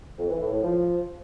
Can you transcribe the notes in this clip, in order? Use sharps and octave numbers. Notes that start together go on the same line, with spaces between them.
F2
E3
A2
A2
F3